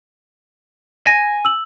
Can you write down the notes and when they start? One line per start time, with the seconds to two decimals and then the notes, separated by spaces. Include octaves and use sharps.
1.07 G#5 A#6
1.45 E6 F#7